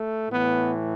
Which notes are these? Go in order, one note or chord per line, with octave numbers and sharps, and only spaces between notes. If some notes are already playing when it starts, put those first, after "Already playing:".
Already playing: A3
A2 E3 B3